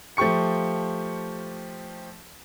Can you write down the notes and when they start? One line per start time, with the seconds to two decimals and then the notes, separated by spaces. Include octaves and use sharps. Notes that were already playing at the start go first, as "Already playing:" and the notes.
0.17 F3 A3 G4 C#6 C#7